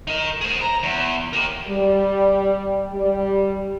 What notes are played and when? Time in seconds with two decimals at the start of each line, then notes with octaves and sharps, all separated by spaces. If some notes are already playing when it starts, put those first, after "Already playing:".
0.07 D#4 A#4
0.41 G#4 C5
0.61 A#5
0.83 E2
1.33 G4 A#4
1.68 G3
2.93 G3